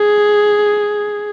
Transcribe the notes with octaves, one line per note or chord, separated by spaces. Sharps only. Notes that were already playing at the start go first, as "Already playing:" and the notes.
Already playing: G#4